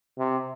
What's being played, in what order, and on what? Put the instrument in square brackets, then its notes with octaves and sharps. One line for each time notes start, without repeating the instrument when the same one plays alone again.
[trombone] C3